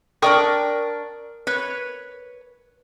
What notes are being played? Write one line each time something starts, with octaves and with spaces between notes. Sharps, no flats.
D4 A#4 D5 G5 C#6 D#6
B4 C#5